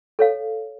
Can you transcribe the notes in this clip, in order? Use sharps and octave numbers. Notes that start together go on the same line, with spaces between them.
A4 C#5 F5